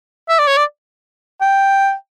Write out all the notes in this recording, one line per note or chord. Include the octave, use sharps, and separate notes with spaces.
E5
D5
C#5
D5
G5